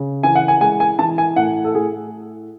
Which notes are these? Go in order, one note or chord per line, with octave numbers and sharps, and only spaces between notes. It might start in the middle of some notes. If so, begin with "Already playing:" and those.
Already playing: C#3
E3 G#5
F#5
G#5
G#3 G#5
G#5
E3 A5
G#5
A2 F#5
A4
A2 G#4